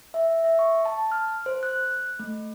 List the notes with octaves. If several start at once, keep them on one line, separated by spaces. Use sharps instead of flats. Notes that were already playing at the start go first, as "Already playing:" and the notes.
E5
E5
C#6
A5
F6
C5
F#6
A3